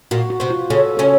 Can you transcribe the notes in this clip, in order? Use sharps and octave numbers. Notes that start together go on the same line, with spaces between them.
A#2 A#3 F#4
F#4
C3 C4
F4
C#3 C#4 A4
C#3 C#4 A4